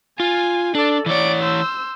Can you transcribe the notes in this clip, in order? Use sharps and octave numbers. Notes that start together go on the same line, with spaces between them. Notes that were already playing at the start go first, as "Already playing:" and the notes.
F4 G#5
D4 A4 D5
E3 C#5 D5 D7
C5 E6